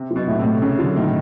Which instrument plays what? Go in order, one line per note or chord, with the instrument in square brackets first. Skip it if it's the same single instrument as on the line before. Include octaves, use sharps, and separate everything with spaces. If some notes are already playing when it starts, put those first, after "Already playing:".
Already playing: [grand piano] C3
[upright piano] F#3
[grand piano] B2
[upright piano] A2
[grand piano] C3
[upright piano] A3
[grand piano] C#3 [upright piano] C#4
[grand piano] D3 [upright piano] F#3
[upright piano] A2 [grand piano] D#3